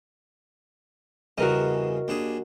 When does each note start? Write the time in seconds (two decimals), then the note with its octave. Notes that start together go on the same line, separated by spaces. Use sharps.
1.38 E2 G2 C#3 F#4 A#4 D#5
2.08 D#2 D4 G#4